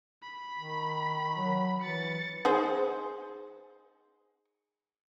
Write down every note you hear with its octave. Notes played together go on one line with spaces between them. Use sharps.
B5
D#3
F#3
E3 A6 C#7
D#4 G#4 C5